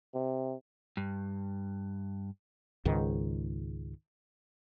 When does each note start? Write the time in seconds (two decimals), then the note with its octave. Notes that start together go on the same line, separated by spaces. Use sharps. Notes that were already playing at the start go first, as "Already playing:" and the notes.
0.15 C3
0.97 G2
2.85 C#2 G#2 D#3